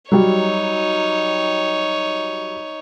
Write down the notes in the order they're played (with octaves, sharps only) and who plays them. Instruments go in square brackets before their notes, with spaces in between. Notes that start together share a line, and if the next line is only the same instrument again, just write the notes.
[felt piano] F#3 G3 [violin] D#4 C#5